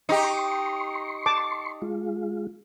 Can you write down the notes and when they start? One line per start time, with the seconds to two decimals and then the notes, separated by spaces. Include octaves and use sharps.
0.09 D#4 G4 C6 C#6
1.26 A5 D6
1.82 G#3 F4